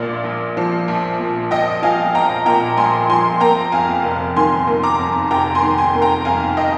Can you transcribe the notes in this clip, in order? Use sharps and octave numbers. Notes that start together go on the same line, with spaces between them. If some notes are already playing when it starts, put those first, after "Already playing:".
Already playing: A#1 A#2 D5 F5
A#1
F3
A#1
A#2
A#1 D#5 G5
F3 F5 G#5
A#1 G5 A#5
A#2 G5 A#5
A#1 G#5 C6
F3 G#5 C6
A#3 G5 A#5
F2 F5 G#5
F1
D#3 G#5 C6
A#3
A#5 D6
F2
F1 G5 A#5
G#5 C6
D#3
G#5 C6
A#3
G5 A#5
F2 F5 G#5
D#5 G5